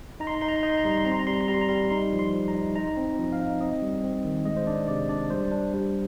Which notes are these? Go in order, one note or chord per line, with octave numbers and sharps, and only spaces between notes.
D#4 A#5
C6
A#5
D#4 C6
A#5
C6
D#4 A#5
C6
A#5
G3 C6
A#5
C6
C4 A#5
C6
A#5
G3 C6
A#5
C6
G3 A#5
C6
A#5
G3 C6
A#5
D#4 C6
F3
C6
F3
A#5
D#4
D#4 A#5
C4
F3
F5
D#4
C4 D#5
G3
C4
D#3
G#3 D#5
C5
D4 D5
C3 D5
D4 D5
G3 C5
D4
G3